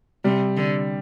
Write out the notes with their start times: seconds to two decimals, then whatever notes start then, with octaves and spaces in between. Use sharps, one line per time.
0.24 C3 G3
0.57 D3